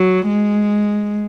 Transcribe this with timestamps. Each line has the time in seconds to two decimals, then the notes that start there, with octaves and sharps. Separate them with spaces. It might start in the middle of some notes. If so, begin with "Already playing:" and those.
Already playing: F#3
0.27 G#3